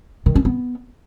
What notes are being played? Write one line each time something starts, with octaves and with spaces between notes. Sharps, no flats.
D#3
C#4
B3